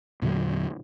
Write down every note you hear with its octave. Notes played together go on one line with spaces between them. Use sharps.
E2 A#2 D3 F#3